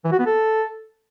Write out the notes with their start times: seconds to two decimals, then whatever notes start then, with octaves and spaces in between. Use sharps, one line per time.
0.05 E3
0.12 F#4
0.19 B3
0.26 A4